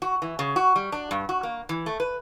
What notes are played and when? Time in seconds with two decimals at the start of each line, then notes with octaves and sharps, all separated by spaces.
0.02 F#4
0.22 E3
0.39 C#3
0.56 F#4
0.76 G3
0.92 D4
1.11 G2
1.29 F#4
1.43 A#3
1.69 E3
1.86 A3
2.00 B4